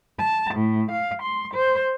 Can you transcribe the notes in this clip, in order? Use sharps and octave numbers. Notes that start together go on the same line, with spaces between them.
A5
A2
F5
C6
C5